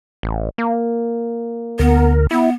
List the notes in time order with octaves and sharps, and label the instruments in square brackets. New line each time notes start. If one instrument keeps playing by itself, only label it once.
[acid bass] A1
A#3
[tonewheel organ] D2 A#4 [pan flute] B3
[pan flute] B3 [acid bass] E4